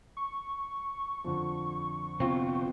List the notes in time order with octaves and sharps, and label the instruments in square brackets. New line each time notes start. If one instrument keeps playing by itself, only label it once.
[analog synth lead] C#6
[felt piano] F2 D3 D4
[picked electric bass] C3 B3 [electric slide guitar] C4 F4